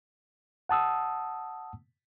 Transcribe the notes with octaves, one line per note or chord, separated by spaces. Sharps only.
F#5 A5 D#6 E6